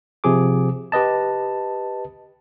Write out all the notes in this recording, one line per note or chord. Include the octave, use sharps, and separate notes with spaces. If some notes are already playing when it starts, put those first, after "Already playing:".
C3 F3 G#4 D6
G4 B4 D#5 A5